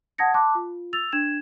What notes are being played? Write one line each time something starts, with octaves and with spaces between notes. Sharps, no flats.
F#5 A5 D#6 G#6 A#6 C#7
A5 C6 D6 F#6
F4
E6 A6 F7
D4 G#6 E7